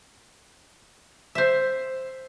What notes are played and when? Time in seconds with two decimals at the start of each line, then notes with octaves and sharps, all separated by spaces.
1.35 C5 E5